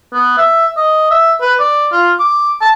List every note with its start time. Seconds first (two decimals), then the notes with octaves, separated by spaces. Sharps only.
0.14 B3
0.38 E5
0.77 D#5
1.11 E5
1.41 B4
1.59 D5
1.92 F4
2.20 D6
2.61 A5